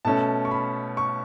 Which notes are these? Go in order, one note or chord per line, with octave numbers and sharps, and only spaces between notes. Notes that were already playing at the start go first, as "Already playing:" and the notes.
B2 A3 C#4 A5
C#6
B5
C#6